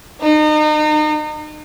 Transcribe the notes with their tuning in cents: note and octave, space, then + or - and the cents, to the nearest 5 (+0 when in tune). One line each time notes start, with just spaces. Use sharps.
D#4 -35